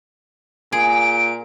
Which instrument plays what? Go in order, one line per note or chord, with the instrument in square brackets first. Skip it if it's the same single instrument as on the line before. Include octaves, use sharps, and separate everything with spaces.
[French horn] A#2 [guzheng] G#4 [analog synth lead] D7